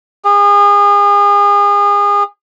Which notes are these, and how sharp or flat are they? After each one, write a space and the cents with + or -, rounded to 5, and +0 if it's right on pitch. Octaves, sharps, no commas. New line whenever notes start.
G#4 -35